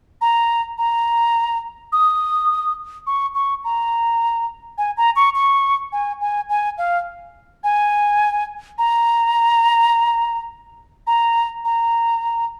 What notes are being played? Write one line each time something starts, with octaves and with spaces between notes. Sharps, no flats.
A#5
A#5
D#6
C#6
C#6
A#5
G#5
A#5
C#6
C#6
G#5
G#5
G#5
F5
G#5
A#5
A#5
A#5